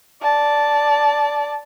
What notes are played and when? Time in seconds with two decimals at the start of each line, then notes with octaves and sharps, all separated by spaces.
0.22 D5 A5